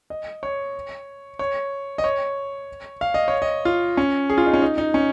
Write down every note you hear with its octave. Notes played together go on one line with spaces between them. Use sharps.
D#5
C#5
C#5
D#5
C#5
F5
D#5
C#5
D#5
F4
C#4
G#4
F4
D#4
C#4
D#4
D#4
C#4